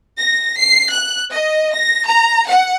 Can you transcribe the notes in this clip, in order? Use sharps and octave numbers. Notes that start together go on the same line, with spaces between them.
A#6
C7
F#6
D#5
A#6
A#5
F#5